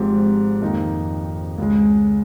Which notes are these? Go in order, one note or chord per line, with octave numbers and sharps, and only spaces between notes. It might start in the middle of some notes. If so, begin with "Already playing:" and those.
Already playing: G#1 G#2 F3 C4 G4
F2 D#3 A#3 D#4
C#2 C#3 G#3